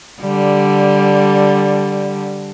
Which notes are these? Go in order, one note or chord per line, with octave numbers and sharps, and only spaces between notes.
D3 G3